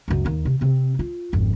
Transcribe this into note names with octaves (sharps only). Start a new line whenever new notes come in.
C#2 F#2
D#2 D#3
C3
C3 C4
F4
G#1 F2